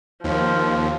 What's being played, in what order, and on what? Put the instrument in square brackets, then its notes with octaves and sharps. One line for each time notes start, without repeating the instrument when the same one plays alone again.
[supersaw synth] D#2 [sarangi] F3